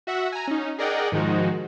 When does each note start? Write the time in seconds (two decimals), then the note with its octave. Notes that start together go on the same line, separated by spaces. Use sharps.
0.07 F#4 E5 F#5
0.32 G#5 A#5
0.47 C#4 D#4
0.78 G#4 A#4 D5 D#5 F#5 G5
1.12 G#2 D#3 F3 G#3 D#4 F#4